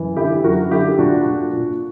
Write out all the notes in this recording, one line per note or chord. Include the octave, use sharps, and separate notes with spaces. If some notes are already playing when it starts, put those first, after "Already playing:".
Already playing: F#2 E3
D3 E4 G4
F#2 F#4 A#4
D3 E4 G4
A#2 D4 F#4
A#2
A#2